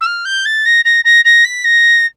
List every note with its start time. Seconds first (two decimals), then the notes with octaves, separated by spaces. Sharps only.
0.01 E6
0.06 F6
0.25 G6
0.45 A6
0.65 A#6
0.85 A#6
1.04 A#6
1.25 A#6
1.44 B6
1.64 A#6